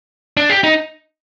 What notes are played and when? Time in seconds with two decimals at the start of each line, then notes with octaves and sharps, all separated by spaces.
0.37 D4
0.50 G4
0.64 D#4